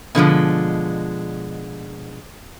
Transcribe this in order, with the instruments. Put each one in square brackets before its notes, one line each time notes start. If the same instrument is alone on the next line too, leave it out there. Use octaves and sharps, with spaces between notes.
[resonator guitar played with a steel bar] B2 D3 F3 G#3